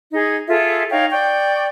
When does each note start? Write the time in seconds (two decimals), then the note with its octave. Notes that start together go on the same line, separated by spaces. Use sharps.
0.12 D#4 G#4
0.48 F4 G#4 A4 E5
0.91 D#4 C#5 F5 G5
1.10 D5 G5 C#6